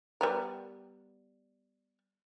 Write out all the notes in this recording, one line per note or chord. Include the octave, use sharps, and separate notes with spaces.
G3 B3 A#4